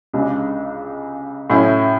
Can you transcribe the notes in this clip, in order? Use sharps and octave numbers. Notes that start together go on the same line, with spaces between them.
C#2 C#3 G#3 D4
A2 F#3 C#4 E4